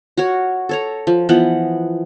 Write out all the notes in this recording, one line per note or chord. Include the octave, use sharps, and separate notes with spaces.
F#4 A#4 C#5
A4 C#5 A#5
F3
E3 F3 B3 F#5